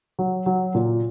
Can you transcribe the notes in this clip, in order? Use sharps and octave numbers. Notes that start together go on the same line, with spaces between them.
F#3
F#3
A#2